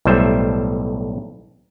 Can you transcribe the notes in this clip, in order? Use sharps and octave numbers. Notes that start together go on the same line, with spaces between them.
B1 A2 G3 C5 E5